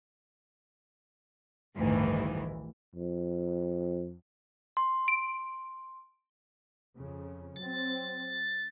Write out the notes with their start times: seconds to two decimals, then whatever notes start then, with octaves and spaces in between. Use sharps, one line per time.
1.76 A1 D2 G2 D#3 E3
2.95 F2
4.77 C6
5.08 D7
6.96 F2 C#3
7.56 F#3 C4 A6